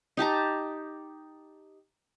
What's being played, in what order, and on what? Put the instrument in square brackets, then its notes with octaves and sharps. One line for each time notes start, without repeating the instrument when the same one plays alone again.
[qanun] D#4 G4 A5 A#5